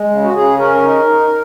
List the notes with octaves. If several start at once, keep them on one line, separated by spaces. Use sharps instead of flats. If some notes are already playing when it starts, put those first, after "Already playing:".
Already playing: G#3
C#3
F#4
C#3 G#4
C#4 A#4
D#4
D#4